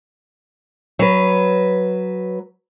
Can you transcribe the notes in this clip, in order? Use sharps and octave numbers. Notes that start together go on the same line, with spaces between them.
F#3 B4